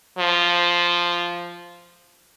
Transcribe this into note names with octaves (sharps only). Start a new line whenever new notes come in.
F3